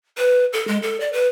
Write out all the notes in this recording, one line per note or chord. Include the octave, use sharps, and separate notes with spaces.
B4
A4
G#3
A4
D5
B4